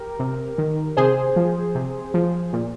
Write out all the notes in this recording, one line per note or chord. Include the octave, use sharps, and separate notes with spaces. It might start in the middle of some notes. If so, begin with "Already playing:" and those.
Already playing: G4 A#4
C3
D#3
C3 G#4 C5
F3
C3
F3
A#2